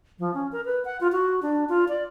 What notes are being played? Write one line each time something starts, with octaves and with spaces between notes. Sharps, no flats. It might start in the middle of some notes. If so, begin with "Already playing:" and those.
F3
C#4
A#4
B4
F#5
F4
F#4
D4
F4
D5